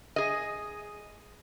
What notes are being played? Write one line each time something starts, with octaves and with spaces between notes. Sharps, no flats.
G#4 D#5